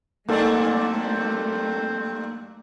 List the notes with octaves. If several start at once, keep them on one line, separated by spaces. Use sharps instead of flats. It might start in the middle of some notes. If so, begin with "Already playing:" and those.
G2 F#3 A3 A#3 C4 A4 C5 D5